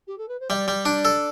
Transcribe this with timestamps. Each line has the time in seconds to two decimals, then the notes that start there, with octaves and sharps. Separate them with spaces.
0.07 G4
0.17 A4
0.28 B4
0.40 C5
0.50 G3 D5 E5
0.68 G3
0.85 D4
1.05 A4